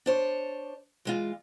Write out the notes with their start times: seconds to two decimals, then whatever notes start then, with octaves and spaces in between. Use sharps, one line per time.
0.06 D4 C5 C#5
1.05 E3 G#3 F4